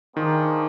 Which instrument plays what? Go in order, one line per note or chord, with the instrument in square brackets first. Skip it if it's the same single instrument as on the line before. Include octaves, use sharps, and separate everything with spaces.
[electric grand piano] D#3 [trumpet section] A#3 D4 G#4 C5